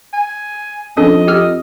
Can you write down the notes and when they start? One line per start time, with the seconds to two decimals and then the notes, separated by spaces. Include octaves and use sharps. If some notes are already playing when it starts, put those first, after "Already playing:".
0.13 G#5
0.97 F2 C#4 D4 A4 D#5
1.28 G4 E6 F6